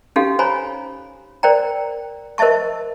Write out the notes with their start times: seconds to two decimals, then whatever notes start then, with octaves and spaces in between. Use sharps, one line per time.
0.16 C#4 D#4 F#4 G4 A4 F5
0.39 C5 C#5 G#5 A#5 B5
1.43 A#4 C5 D5 G5 A#5
2.38 A#4 C5 D#5 E5 A5 C#6